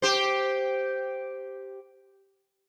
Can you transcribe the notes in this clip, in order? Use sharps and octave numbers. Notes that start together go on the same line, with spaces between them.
G4 C5